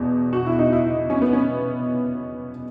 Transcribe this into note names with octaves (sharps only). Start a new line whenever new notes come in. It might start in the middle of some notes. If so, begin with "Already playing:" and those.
Already playing: E2 B2
F#4
E4
D#4
E4
C#4
B3
C#4